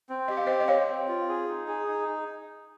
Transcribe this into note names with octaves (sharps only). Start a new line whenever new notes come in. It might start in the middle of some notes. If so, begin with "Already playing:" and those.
C4
G4 D#5
F5
C4 C5 D#5
D#5
C4 C#5 F5
C4
F4
G#4
D#4
G#4
D#4